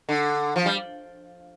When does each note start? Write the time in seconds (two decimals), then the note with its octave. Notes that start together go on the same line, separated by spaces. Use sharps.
0.09 D3
0.56 F3
0.66 G3